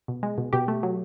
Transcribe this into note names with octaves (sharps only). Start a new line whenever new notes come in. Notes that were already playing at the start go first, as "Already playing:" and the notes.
B2
G#3
B2
B2 G4
A3
F#3